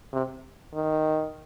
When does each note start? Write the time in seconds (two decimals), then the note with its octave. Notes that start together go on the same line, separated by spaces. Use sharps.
0.13 C3
0.74 D#3